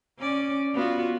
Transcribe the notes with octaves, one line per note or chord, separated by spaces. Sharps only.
C#4 D5
B3 F4 F#4